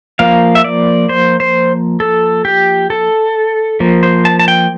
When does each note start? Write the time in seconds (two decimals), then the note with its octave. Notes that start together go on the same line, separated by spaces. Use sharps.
0.19 F3 A#3 F5
0.55 E5
0.64 D5
1.09 C5
1.40 C5
2.00 A4
2.45 G4
2.90 A4
3.80 F3 A#3
4.03 C5
4.25 A5
4.39 A5
4.48 G5